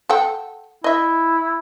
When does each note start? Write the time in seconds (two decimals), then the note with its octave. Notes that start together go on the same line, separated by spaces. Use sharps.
0.09 A4 F#5 G5
0.84 E4 D#5 E5